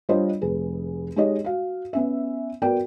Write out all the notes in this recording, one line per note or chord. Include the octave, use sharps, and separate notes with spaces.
G3 D4 F4 C5 C#5 D#5
F1 G#4 B4
G#3 D#4 G4 C#5 D#5
F#4 F5
B3 C#4 E5
B3 F#4 A#4 D5 G5